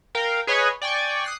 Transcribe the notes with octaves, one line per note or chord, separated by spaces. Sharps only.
A#4 F5 G5
G#4 B4 C#5 D#5 G#5
D5 G5 G#5 C#6
D#6 F#6 C7